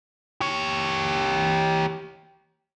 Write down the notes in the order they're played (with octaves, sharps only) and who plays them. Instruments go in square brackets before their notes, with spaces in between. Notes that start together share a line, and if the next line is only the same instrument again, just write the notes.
[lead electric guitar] G4 C#5